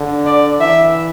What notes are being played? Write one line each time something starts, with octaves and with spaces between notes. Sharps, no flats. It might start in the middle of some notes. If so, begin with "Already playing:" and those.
Already playing: D3
D5
E3 E5